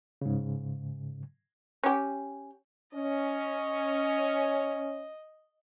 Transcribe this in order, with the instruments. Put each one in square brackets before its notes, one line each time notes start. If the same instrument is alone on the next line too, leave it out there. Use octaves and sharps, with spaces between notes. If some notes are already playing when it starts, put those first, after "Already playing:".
[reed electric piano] G#2 C#3
[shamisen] C#4 G4
[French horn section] C#4 [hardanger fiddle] D#5